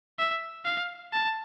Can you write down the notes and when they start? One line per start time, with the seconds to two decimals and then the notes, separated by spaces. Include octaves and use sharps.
0.19 E5
0.65 F5
1.13 A5